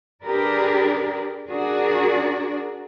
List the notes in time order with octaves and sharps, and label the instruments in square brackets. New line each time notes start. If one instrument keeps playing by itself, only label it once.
[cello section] D4 G4 G#4 A#4 B4 D5
D4 F#4 G#4 A#4 D5